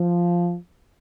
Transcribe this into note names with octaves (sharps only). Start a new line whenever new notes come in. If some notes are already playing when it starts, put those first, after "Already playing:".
Already playing: F3